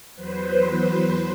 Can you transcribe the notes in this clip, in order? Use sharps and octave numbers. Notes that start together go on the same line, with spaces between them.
E2 F#3 B4 C5